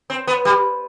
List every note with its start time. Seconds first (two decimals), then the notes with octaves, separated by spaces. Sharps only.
0.10 C4
0.27 B3
0.45 G3